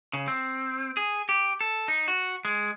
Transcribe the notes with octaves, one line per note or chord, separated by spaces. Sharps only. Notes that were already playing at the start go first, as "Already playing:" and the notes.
C#3
C4
G#4
G4
A4
D#4
F#4
G#3